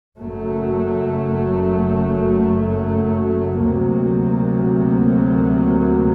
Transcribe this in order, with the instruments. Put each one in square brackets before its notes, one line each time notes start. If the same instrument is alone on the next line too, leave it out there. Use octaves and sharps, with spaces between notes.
[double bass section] F#1 F#2 F#3 A3
D2 C3 F#3 A#3